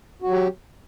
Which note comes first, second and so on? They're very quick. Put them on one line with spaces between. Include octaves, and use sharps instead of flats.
F#4 F#3 G4